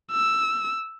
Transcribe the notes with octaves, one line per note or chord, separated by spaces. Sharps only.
E6